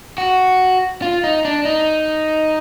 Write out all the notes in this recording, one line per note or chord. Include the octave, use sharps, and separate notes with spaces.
F#4
F4
D#4
D4
D#4